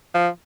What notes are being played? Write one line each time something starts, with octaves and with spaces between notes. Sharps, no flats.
F3